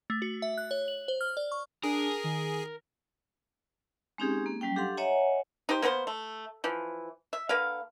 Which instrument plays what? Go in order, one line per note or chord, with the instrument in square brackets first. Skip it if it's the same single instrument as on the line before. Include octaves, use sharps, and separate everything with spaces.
[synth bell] A3
F#4
E5
F#6
C#5
F#7
C5
F6
D5
C#6
[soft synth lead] D4 [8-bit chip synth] G#4 [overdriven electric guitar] A#4
[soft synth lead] D#3
[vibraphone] G#3 C4 C#4 D#4 G4 G#4
A#3
F#3 G3 C#4 G5
D4 G4 A4 F5 F#5 C6
C#5 D#5 E5 F#5 G#5 A#5
[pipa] D#4 G4 C5
A#3 B3 B4 C5
A3
E3 F3
E5
D3 A#3 B4 F5